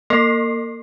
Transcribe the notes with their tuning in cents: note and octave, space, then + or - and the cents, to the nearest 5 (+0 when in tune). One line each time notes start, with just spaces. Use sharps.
A#3 +0 A#4 -45